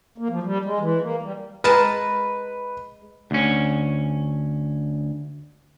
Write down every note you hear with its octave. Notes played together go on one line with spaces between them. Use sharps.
A#3
F3
G3
G#3
E3
A#3
G3
G#3 A#4 B4 A5
D2 C#4